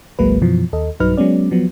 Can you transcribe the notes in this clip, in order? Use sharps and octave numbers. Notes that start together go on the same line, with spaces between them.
G#1 C#2 F#3 G#3 A#3 B4
F#2 B2 E3 F3
D#2 A4 D#5
B1 G2 F#3 D#4 B4 F6
F#3 G#3 B3 C#4 D5
F3 F#3 B3